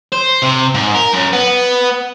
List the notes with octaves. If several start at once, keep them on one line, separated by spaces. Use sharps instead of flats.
C5
C3
G#2
A#4
F#2
B3